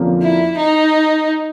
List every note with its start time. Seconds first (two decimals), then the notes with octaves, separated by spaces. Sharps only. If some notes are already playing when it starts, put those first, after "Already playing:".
Already playing: F2 D3 F3 A#3 C#4
0.22 E4
0.57 D#4